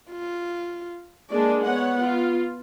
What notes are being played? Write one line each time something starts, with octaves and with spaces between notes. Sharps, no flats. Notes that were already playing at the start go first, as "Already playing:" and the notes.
F4
G#3 A#3 D4 D5
B3 C#5 F#5
F4